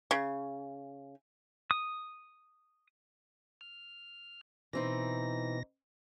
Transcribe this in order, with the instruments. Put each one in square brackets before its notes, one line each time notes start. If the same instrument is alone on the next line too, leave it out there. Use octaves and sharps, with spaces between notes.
[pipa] C#3
[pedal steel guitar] D#6
[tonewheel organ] F6
[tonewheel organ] B2 A#6 [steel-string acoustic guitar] E3 C4 D#4